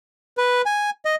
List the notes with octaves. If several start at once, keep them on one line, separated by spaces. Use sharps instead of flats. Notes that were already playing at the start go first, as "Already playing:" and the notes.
B4
G#5
D#5